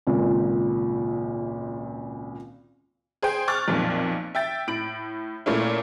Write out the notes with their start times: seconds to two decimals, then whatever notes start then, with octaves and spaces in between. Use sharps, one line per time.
0.07 G#1 C#2 A#2
3.22 G#4 C5 G5
3.48 C#6 D6 F6 F#6 A6
3.68 B1 F2 A#2
4.35 E5 G5 A6
4.67 A2 D7 F#7
5.46 A#2 A3 C#4 E4